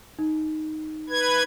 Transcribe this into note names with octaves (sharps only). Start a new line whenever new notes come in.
D#4
B4 G#6